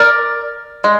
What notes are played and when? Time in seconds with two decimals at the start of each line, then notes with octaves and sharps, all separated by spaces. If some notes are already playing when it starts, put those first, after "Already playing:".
Already playing: A#4 D5
0.84 G#3